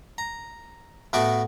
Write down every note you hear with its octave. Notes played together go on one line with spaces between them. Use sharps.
A#5
A2 B3 F#4 D5 C#6 D6